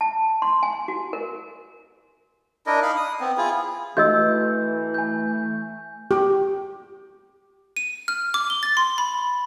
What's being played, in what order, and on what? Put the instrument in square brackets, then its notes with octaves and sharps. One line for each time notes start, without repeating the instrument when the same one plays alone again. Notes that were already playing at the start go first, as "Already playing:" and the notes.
[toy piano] A5
C6
G#5
F#4
A#4
[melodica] D4 E4 A#4 D#5
D#4 F5 B5
D#6
B3 C4
E4 F4 G#4
[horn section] E3 [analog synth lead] A3 [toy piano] F#4 D#5 E6 [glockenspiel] G6
[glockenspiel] G#5 G6
[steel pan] G4
[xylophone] D#7
F6
D6
G7
A6
C6
B5